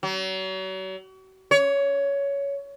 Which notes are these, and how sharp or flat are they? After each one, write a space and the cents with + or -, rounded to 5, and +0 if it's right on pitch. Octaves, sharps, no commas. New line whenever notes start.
F#3 +40
C#5 +15